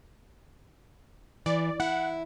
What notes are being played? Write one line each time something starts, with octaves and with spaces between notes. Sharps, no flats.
E3 D5
E4 F#5